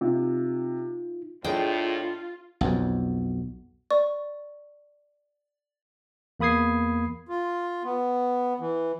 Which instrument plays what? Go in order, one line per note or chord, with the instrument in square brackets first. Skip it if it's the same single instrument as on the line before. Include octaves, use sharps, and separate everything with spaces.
[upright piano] C3 [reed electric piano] D#4 F4
[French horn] A2 [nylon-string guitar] D4 G#4 D#5 [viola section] F4 [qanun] G5
[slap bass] B1 F2
[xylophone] D5 C#6
[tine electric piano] E2 A#3 B5 D#6 G#6 C7
[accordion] F4
B3
E3